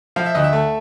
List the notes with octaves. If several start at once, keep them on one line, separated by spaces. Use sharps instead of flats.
F3 F5
E5
D2 D#5
E5
A3